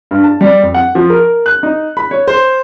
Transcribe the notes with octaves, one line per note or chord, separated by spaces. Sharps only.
G2
A5
G3
F2
F#5
F3
A#4
F#6
D#4
B5
C#5
C5